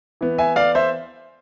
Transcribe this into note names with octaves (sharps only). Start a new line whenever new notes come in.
E3 B3
E5 G#5
D5 F5
C5 E5